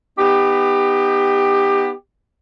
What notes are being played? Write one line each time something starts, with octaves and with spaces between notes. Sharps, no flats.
B3 D#4 G4